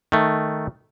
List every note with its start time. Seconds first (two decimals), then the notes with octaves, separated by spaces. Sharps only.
0.12 D#3 A3